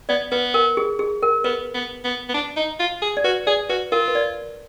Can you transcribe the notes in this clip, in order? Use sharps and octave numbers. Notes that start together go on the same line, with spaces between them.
B3 D5
B3 B4
A#4
G#4
G#4
A#4
B3 B4
B3
B3
B3
D4
D#4
F4
G#4
D5
F#4 B4
G#4 D5
F#4 B4
F4 A#4
B4
D5